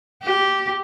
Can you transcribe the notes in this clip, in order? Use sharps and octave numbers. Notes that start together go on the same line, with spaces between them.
G4